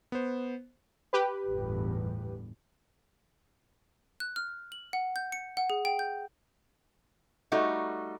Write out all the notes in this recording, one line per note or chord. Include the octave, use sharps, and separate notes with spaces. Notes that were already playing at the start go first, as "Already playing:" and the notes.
B3 C5
G4 B4
G1 E2 A2
F#6
F6
F#7
F#5
G6
C#7
F#5
G#4
G5
G6
G3 A3 D#4 F#4